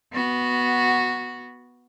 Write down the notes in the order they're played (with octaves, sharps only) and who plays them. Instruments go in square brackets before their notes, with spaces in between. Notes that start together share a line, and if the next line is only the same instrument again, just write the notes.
[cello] B3 F#4